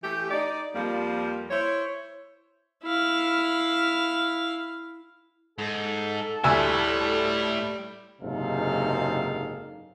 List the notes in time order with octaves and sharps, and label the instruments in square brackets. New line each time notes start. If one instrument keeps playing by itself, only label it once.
[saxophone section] E3 A3 G4
D#4 D5
F2 F3 G3 A#3
E4 C5 C#5
[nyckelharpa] E4 F5
[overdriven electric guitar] G#2 [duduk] A4
[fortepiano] D2 E5 G#5 [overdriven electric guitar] A2 E4 [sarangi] G3
[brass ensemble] F#1 G#2 C3 D#4 A4 F5